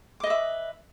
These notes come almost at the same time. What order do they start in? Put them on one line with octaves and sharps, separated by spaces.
D6 D#5 B4 E5